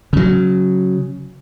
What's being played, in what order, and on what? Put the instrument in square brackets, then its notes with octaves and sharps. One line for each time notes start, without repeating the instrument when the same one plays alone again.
[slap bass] C#3 F#3